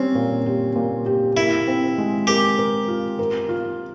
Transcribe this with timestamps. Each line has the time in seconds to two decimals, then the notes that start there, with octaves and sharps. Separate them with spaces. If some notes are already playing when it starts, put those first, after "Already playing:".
Already playing: G3 C4 C#4
0.15 A#2
0.46 G4
0.76 A#2
1.06 G4
1.37 E4 A#4
1.68 C4
1.98 G#3
2.27 G4 A#4
2.59 A#4
2.88 F4
3.19 A#4
3.49 F4